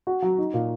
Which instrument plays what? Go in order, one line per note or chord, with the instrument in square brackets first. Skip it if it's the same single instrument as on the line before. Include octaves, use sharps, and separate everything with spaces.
[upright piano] F#4
F#3
D#4
A#2